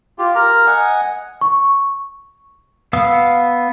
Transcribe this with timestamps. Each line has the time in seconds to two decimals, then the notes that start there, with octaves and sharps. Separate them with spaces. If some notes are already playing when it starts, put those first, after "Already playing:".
0.18 F4 G4
0.35 A#4 A#5
0.66 D#5 F#5 G#5
1.41 C#6
2.93 B3 F5 D#6 E6